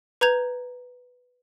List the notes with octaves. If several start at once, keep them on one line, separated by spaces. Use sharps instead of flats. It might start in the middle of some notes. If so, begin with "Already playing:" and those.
B4 A#5 G6 G#6 F7